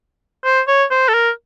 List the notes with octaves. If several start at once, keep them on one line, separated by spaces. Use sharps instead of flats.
C5
C#5
C5
A4
A#4